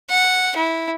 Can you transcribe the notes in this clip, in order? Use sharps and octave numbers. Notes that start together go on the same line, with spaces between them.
F#5
E4